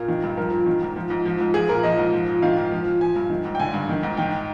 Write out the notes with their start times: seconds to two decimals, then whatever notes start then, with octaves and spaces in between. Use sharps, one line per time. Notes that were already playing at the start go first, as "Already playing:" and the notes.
Already playing: A#2 A#4
0.08 D#3
0.23 G2
0.37 F3 A#4
0.53 A#2
0.66 D#3
0.82 G#2
0.96 F3
1.10 G#2
1.26 F3
1.40 G#2
1.54 F3 G#4
1.69 A#2 A#4
1.83 F3 D#5
1.98 G#2
2.13 F3
2.28 A#2
2.42 D#3 F5
2.57 G#2
2.71 F3
2.86 A#2
3.01 F3 G#5
3.16 G2
3.30 D#3
3.45 G#2
3.55 G5
3.59 D3 G#5
3.74 G2
3.89 D#3
4.03 G#2
4.17 D#3 G5